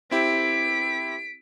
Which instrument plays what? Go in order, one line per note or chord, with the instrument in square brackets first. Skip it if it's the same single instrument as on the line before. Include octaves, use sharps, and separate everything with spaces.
[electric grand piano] C4 E4 G4 [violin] B6 D7